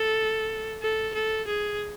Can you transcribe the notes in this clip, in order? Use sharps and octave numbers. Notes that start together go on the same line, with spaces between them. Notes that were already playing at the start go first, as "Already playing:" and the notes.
Already playing: A4
A4
A4
G#4